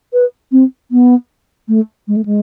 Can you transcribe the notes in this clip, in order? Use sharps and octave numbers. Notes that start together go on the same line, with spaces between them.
B4
C4
B3
A3
G#3
A3
G#3